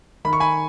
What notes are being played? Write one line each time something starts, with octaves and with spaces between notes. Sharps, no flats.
D#3 B5
C#6
G#5 B5